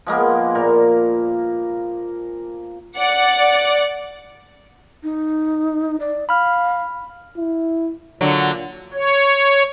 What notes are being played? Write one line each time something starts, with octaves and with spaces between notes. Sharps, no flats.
F3 G#3 A#3 B3
A#2 A#4
D5 F#5
D#4
D5
F5 B5 F6
E4
A#2 D3 F#3
C#5